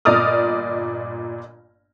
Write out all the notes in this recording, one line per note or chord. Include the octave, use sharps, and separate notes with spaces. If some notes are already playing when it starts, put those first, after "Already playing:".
G1 A#2 D5 D#5 D#6 F6